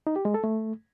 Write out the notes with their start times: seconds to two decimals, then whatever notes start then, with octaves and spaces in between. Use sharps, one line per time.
0.07 D#4
0.16 G4
0.25 G#3
0.34 A4
0.44 A3